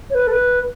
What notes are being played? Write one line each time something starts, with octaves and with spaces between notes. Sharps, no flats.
C#5
B4
A4
B4